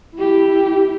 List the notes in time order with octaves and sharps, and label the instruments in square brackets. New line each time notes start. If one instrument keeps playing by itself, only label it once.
[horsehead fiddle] E4 G4